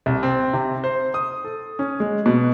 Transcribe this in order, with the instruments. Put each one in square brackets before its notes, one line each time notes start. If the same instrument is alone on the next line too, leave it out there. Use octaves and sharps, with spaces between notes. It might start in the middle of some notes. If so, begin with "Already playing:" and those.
[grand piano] C2
C4
C3
C5
D#6
A4
C#4
G#3
B2